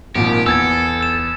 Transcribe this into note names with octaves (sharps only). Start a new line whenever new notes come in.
G#1 A#2 F3 G4
E2 A4 E6 G#6 A6
E6 E7